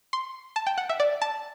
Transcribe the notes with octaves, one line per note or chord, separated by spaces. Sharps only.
C6
A5
G5
F#5
E5
D5
A5